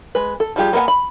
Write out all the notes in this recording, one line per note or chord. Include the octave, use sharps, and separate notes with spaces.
G#3 B4
A4
F3 G3 F4 G4 G#4
A#3 B3 A4 F#5 G#5
B5